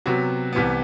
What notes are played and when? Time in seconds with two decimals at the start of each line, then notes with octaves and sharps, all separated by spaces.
0.06 C3 F#3 B3 F#4
0.53 C2 C3 E3 B3